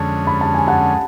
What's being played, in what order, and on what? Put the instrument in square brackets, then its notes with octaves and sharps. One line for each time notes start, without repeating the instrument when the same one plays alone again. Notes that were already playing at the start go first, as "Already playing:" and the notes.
Already playing: [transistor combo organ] F2 D3 G#3 C#4 [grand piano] A5
[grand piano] B5
A5
G#5
F#5 A5